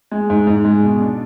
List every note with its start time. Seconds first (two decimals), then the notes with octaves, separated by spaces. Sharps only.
0.11 G#3
0.30 G#2
0.47 G#2
0.65 G#3
0.83 B2
1.01 D4